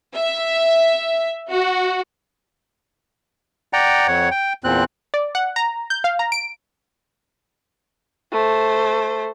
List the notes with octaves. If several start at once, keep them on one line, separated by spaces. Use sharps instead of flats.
E5
F#4
D5 F#5 G5 A#5
F2 C#5 F#5
G5
E2 A#2 C4 F#6
D5
F#5
A#5
G6
F5
A#5
D7
A3 C5